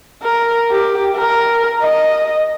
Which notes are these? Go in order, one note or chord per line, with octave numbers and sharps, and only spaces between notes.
A#4
G4
A#4
D#5